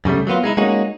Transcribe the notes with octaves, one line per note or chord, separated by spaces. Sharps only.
F#2 C#3 G3 A3
F#3 A#3 B3 F4
G#3 D#4 E4
G#3 A#3 C#4 D#4 F#4